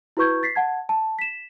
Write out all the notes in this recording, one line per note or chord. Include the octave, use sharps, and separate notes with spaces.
E4 F#4 B4 C#6 G6 G#6
A6 B6 C7
F#5 A5 G#6
A5
B6 E7